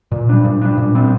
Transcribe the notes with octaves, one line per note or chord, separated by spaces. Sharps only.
A#2
G3 D4
A#2
G3 D4
A#2
G3 C4